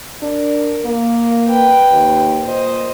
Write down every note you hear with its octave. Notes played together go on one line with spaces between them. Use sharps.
D4 A#4
A#3
B4 G5
D#2
A#2 C5 D#5